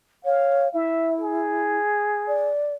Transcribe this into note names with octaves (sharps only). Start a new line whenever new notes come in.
C#5 F5
E4 E5
G#4
D5